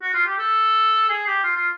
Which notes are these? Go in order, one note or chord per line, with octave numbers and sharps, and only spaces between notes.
F#4
F4
G4
A4
G#4
G4
F4
F4